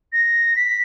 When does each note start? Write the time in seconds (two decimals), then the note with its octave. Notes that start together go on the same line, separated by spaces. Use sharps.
0.13 A#6
0.56 B6